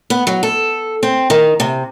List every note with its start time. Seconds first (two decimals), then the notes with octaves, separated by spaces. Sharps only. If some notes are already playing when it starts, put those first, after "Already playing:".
0.10 B3
0.27 F#3
0.43 A4
1.03 C4
1.30 D#3
1.60 C3